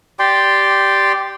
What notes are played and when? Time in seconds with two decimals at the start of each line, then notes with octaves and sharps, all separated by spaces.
0.19 G4 D5 G5 C6